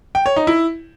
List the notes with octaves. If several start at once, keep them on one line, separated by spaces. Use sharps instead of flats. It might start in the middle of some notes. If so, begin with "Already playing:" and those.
G5
C#5
D#4
E4